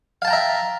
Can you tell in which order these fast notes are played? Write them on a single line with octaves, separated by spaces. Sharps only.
F5 A5 G5 A#5 E5